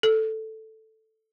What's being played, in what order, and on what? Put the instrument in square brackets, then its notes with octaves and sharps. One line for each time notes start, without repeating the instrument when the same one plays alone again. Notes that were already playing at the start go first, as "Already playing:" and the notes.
[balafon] A4